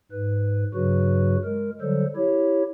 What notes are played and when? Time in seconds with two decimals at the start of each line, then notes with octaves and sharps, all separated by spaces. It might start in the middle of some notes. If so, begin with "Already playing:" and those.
0.12 G#2 B4
0.74 G2 C#3 F#3 F#4 B4
1.44 G#3 A#4
1.81 D3 F#3 G3 A4 C5
2.16 E4 G4 C#5